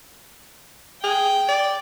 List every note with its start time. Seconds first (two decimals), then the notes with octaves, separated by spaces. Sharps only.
1.03 G#4 G5
1.48 D5